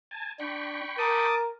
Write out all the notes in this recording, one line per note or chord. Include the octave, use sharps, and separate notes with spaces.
G#5 A5
D4 G5 B5 C#6
A#4 A5 D6 D#6